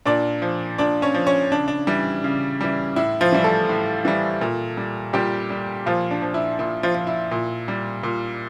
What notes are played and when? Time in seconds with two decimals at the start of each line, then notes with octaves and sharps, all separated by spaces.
0.06 A#2 D4 D5
0.42 F3
0.78 A#2 D4 D5
1.02 C#4 C#5
1.15 F3
1.27 C#4 C#5
1.52 C#3 D4
1.68 D4
1.87 E3 G3
2.24 C#3
2.61 E3 G3
2.96 A2 E4
3.21 F3 F4
3.32 E3 G3
3.44 A3 A4
3.69 A2
4.05 E3 G3
4.41 A#2
4.77 G3
5.13 A#2 G3 G4
5.50 G3
5.86 A#2 F3 F4
6.11 D4
6.22 F3
6.34 E4
6.59 A#2 E4
6.83 F3 F4
6.95 F3
7.07 E4
7.32 A#2
7.68 G3
8.03 A#2